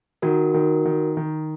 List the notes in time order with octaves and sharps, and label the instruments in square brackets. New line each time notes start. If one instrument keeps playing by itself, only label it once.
[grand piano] D#3 [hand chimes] F#4 A#4
[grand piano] D#3
D#3
D#3